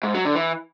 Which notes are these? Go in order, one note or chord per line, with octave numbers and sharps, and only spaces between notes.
G#2
F#3
D3
E3